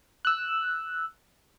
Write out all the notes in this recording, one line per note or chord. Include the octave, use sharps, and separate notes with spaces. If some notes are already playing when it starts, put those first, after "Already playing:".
E6 F#6